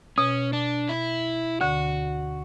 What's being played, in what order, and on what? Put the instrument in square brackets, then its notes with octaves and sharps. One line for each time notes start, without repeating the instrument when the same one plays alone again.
[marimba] B2 [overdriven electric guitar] C#4
[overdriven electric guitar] D4
E4
[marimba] D2 D3 [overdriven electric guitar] F#4